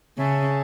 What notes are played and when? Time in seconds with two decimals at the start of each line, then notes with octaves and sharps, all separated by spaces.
0.18 C#3 G#4 C#5 E5 A5